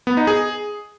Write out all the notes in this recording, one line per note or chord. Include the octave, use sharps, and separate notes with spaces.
B3
D#4
G#4